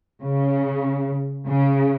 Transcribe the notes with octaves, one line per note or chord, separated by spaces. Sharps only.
C#3
C#3